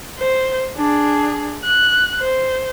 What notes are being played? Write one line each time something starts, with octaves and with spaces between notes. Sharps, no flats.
C5
D4 G#4
F#6
C5